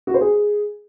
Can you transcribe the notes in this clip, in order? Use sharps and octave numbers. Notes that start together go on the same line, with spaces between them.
F#4
C5
G#4